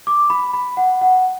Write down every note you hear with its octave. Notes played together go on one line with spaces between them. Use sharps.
D6
B5
B5
F#5
F#5